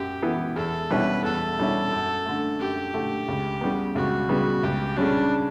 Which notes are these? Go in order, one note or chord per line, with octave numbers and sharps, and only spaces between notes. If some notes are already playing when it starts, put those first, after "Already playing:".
Already playing: F#2 G4
E3 B3
E2 A4
B2 G3 C#4 E4 B4
E2 A4
B2 G3 C#4 E4
F#2
D3 A3
F#2 G4
D3 A3
C#2
C#3 G3 B3
C#2 F#4
C#3 G3 B3
C#2 G4
C#3 G3 C#4 D4